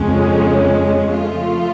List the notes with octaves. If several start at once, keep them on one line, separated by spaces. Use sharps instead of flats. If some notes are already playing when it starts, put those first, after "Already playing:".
Already playing: F2 C#3 G#3 C#4
F3 A3 F4